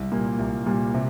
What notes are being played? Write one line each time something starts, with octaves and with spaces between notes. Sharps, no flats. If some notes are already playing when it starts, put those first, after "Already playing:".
Already playing: C2
A#2 G3 A#3
C2
A#2 G3 A#3
C3